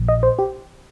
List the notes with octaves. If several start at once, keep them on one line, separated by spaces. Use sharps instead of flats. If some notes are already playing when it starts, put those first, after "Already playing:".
Already playing: A#1 A#2 F3
D#5
C5
G4